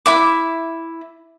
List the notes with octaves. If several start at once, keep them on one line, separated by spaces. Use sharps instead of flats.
E4 E5 D6